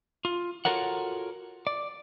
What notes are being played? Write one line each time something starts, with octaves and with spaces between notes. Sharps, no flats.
F4
F4 F#4 A4 A#4 C#5 F#5
D5